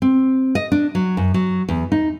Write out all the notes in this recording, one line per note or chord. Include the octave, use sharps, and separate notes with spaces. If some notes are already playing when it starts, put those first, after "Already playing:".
C4
D#5
D4
F#3
F#2
F#3
E2
D#4